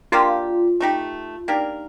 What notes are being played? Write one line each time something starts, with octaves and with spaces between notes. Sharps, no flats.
A#3 D4 F4 G4
A3 D#4 G4
A#3 D4 D#4 G4 A#4